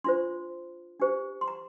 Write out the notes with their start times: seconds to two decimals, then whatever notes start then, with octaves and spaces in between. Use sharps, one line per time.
0.04 D4 F4 C5 C6
1.00 D4 G4 C5
1.41 C6
1.48 A#5